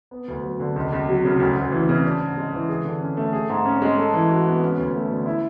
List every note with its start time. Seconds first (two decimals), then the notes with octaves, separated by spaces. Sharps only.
0.11 B3
0.28 D2
0.44 F#3
0.60 D3
0.76 C#2
0.93 C#2
1.09 F#3
1.25 C#3
1.40 D2
1.56 D2
1.72 E3
1.89 C#3
2.04 D4
2.20 G#2
2.37 G#3
2.53 E3
2.69 G#4
2.84 D3
3.00 C#4
3.17 A3
3.33 G#4
3.50 G#2
3.65 C#4
3.82 G#3
3.98 A4
4.13 E3
4.29 F#4
4.46 B3
4.61 C#4
4.77 D2
4.95 A3
5.11 D3
5.26 E4